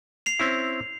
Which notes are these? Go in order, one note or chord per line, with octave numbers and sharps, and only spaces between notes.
C7 F7
C4 C#4 E4